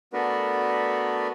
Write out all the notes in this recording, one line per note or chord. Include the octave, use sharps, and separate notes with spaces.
A3 B3 D4 F#4 A#4 B4